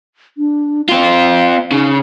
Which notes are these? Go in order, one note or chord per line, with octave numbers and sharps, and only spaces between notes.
D4
C4 F4 F5
C#3 D#4